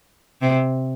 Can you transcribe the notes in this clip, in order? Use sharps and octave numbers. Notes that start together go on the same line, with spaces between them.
C3